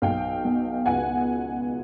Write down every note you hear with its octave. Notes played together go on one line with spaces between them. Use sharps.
B1 F5 G5
B2
C#2 F#5 G#5